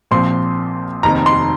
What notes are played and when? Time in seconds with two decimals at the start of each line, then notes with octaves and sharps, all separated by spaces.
0.11 A#1 A#2 F3 C4 C6
1.03 F1 D#2 D#3 C4 A#5
1.26 C6